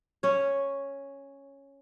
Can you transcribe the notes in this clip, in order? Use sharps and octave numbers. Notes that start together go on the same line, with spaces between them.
C#4 C#5